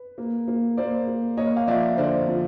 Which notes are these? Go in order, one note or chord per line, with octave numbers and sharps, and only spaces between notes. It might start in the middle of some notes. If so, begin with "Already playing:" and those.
Already playing: B4
A#3
A#3
A#3 C5 D5
A#3
A#3 C#5 D#5
F5
F3 D5 E5
D3 C5 D5
F3